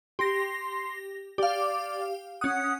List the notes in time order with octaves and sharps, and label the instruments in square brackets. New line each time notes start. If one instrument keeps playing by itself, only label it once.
[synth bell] G4 A#6 [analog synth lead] C6
[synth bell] G4 F5 [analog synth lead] D5
[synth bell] C#4 D#6 [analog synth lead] F#5